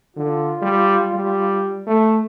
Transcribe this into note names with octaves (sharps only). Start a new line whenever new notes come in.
D3 F4
G3
G3
A3